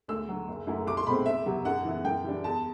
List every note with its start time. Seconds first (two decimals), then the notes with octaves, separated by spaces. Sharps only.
0.08 D2 E6
0.28 D3 F#3
0.48 F#1
0.67 F#2 F#3 A3 E4
0.86 C2 D6
0.97 C6
1.06 B2 A3 C4 B5
1.26 F#1 E5
1.46 E2 C3 F#3
1.65 F#2 F#5
1.85 E3 B3 E4
2.05 F#2 G5
2.24 E3 G3 D4
2.44 E2 A5